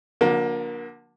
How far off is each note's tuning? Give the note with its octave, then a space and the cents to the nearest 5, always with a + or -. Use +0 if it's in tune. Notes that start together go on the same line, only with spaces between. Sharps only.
D3 +0 F#3 -45 A#3 +25